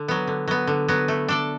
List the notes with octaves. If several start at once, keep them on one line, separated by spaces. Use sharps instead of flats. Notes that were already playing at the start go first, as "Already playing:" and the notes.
Already playing: D3
F#3 B3
D3
F#3 B3
D3
F#3 B3
A3
D4 A4 D5